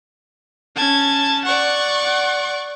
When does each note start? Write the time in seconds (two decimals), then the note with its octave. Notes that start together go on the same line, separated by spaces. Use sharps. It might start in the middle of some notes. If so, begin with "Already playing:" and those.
0.76 C#4 A5 G#6
1.45 D5 F#5 C#6
2.04 F#5